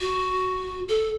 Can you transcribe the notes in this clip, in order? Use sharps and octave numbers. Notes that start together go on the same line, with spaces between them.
F#4
A4